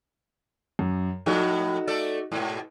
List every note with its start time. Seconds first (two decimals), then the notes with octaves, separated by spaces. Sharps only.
0.79 F#2
1.26 A2 F3 A3 D#4 F#4
1.87 A3 A4 D5
2.32 G#2 B2